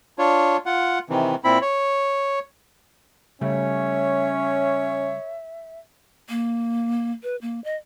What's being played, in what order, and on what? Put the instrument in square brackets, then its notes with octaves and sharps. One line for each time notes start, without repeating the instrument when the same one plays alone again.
[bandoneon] D4 F4 C#5
F4 F#5
C3 D#3 E3
A#2 C4 E4 B5
C#5
[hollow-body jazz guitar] C#3 G3 A3 [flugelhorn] C#4 [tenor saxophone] C#5 [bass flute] E5
[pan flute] A#3
B4
A#3
D#5